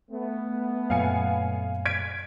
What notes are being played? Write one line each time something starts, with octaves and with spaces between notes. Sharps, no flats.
A3 B3
F#2 A#2 F5 G#5 C#7
G#6 B6 D7